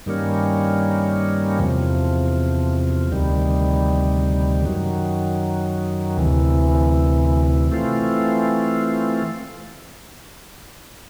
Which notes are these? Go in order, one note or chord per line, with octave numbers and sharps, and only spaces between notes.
G2 D#3 G3 A#3 C#4
E2 C3 F3
D2 C3 D#3 G3
F#2 D#3 F#3
D2 C3 E3
E3 A3 C4 F4